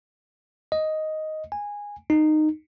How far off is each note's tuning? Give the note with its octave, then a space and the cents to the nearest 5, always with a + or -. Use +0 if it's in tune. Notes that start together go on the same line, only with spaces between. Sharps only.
D#5 +5
G#5 -15
D#4 -15